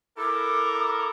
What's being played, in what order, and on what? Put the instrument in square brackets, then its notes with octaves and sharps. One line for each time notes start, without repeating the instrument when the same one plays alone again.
[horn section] E4 A4 A#4 [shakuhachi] D6